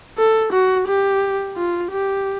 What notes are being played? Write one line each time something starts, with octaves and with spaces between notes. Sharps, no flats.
A4
F#4
G4
F4
G4